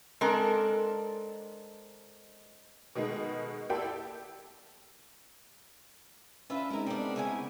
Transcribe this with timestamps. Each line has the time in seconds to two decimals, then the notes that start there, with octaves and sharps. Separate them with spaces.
0.21 G#3 C4 D4 A4 A#4
2.95 B2 D#3 G#3 A3 B3
3.69 A#3 E4 G4 A4 D5 G5
6.50 C#4 D4 F4 B4 E5
6.71 G#3 C4 D#4 E4 A#4
6.86 G3 B3 C4 D4 A#4
7.16 C#3 E4 G#5